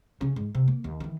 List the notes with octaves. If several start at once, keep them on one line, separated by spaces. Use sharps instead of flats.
C#3 C#4
G#2
C3
A#3
D#2
D#3 E3